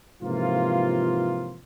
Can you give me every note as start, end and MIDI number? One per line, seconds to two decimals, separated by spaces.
0.22 1.60 44
0.22 1.60 48
0.22 1.60 52
0.22 1.60 53
0.22 1.60 58
0.22 1.60 65